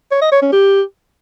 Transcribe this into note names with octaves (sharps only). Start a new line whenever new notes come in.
C#5
D#5
C#5
C#4
G4